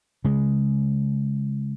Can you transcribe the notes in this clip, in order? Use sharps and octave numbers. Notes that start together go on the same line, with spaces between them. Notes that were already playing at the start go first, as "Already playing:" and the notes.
C#3 G#3